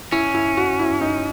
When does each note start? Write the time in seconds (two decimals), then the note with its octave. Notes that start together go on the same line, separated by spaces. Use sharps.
0.12 C#4 E4
0.34 E4
0.57 F#4
0.79 E4
1.01 D#4